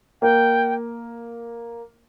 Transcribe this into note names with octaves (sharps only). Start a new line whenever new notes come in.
A#3 G5